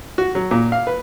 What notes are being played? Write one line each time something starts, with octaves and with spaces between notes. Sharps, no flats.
F#4
F#3
A#2
F5
B4